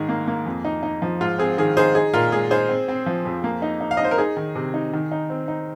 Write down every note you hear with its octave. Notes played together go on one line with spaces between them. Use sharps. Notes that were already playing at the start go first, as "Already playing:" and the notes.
Already playing: G#2 D#3 D#4 G#4
A#3
A#3
F2
D#4
D#4
F3
G#2 F4
C4 G#4
D#3 G#4
D#4 G#4 C5
D#4 G#4
A#2 F4 A#4
G#3 G#4
D#4 G#4 C5
C4
C4
F3
F2
A#3
D#4
D#4
F5
D#5
D#4 C5
A#4
D#4 G#4
D#3
C3
D#4
D#3
D#4
C4
D#4